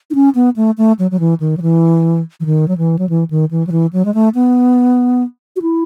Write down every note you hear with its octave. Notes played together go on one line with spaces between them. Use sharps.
D#4
C#4
B3
A3
A3
F#3
F#3
E3
D#3
F#3
E3
E3
D#3
F#3
E3
F#3
E3
D#3
E3
F#3
E3
F#3
G#3
A3
B3
F#4
E4